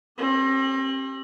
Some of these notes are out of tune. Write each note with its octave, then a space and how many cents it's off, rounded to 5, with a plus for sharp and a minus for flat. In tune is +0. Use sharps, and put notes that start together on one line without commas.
C4 +40 G4 +0